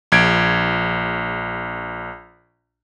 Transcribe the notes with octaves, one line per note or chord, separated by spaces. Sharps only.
A#1 G#6 D7